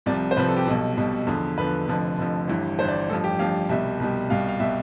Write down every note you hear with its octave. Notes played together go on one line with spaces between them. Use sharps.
C2 C3 F3 D5
C5
C2 C3 F3 B4
A4
G4
B1 B2 G3 A4
B1 B2 G3
E2 D3 F3
E2 D3 F3 B4
F1 F2 D3 F3
F1 F2 D3 F3
G1 G2 E3
G1 G2 E3 C5
D5
A1 G2 F3 A4
G4
A1 G2 F3 F5
C2 B2 G3 E5
C2 B2 G3
C2 B2 G3 F5
F5
B2 G3 E5